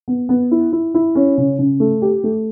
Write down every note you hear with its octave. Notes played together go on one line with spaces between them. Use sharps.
B3
B3
E4
E4
E4
C#4
C#3
C#3
A3
G4
A3